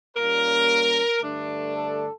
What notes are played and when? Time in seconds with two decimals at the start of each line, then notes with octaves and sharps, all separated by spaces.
0.17 A#2 G3 A#3 C#4 A#4
1.22 G2 D3 A3 D4
1.75 A4